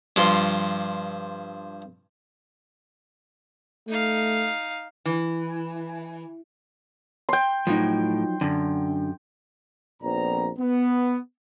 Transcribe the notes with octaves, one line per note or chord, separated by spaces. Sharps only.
G2 F3 C6
A3 D#4 F5
E3
G5 C6
A2 F3 F#3 D#4
F#2 D3
A#1 F2 B3 C4 D5 A#5
B3